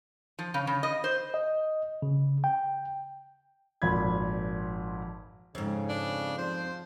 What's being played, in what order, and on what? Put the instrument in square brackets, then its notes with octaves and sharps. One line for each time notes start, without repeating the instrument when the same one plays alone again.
[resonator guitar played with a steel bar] F3
C#3
C#3
D#5
C5
[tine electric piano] D#5
C#3
G5
[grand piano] G#1 F2 A#2 B5 G#6
[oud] F2 G#2 [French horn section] C#3
[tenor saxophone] D4
[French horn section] F3 [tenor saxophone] C5